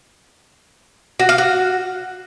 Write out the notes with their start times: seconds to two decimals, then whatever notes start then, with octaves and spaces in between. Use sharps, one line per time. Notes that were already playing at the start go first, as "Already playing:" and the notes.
1.19 F#4
1.29 F5
1.38 F#4